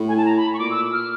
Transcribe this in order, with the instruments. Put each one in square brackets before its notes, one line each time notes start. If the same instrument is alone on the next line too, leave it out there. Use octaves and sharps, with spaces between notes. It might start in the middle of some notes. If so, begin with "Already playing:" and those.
Already playing: [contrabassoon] A2
[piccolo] G#5
A5
A#5
B5
C#6
[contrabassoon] A#2 [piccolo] D6
[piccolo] E6
F6